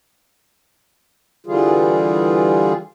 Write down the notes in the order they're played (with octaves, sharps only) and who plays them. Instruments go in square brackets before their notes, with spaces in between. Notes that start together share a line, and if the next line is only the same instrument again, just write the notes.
[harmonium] D3 E3 G3 F4 G#4